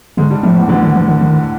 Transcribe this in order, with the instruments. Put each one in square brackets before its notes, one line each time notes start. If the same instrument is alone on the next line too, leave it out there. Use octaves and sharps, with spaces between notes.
[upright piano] G#2 G#3 [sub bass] D3
[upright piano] G2 G3
[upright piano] A2 A3 [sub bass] F3
[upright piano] E2 E3
[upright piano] D2 D3 [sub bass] E3
[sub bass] D#3
E3
D#3
D#3